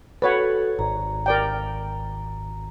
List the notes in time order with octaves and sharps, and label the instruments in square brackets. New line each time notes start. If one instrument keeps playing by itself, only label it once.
[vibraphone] F#4 A4 [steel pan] B4 C#5 F#5
[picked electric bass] G#1 [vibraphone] A#5
[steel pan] A#4 D5 G5